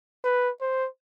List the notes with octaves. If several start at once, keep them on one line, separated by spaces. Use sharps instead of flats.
B4
C5